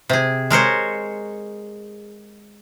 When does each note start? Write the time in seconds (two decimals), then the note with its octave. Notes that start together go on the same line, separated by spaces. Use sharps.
0.09 C3 G#4
0.50 G#3 A#4 C5 C#5